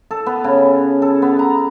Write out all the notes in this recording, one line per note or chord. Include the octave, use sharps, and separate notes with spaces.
A4
B3
C#3
A4
B3
A#5